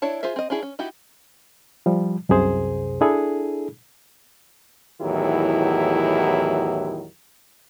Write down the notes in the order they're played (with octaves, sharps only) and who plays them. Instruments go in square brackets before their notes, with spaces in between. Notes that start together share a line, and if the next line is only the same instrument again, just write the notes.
[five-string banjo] D4 E4 C#5 A5
F4 G#4 C5 E5
C4 D#5
C#4 D4 E4 G#4
C#4
D#4 E4 F#4 G4
[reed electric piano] F3 G3
C2 F#2 C3 G#4 C5
D4 E4 G#4 A4
[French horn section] E2 A2 D#3 F#3 E4 G4